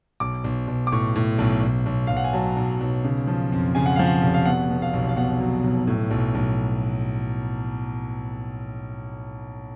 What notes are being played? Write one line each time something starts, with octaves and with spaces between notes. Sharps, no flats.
B1 D6
B1
B1
D6
A2 C#6
A2
B1
B1
B1
B1 F5
F#5
G#5
F#3 A5
B1
B1
C#3
F3
F2
C#3 G#5
F#5
F3 F5
F#5
F1
F5
B2 F#5
B2
F5
B1
F5
B2 F#5
F#3
B1
A2
B1
B1